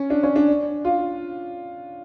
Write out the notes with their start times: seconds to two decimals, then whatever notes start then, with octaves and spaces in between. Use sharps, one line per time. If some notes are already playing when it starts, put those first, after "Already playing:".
Already playing: C#4
0.10 D4
0.23 C#4
0.36 D4
0.85 F4